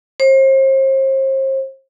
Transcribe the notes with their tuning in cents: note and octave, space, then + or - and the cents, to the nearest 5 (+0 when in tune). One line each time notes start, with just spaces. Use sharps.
C5 +40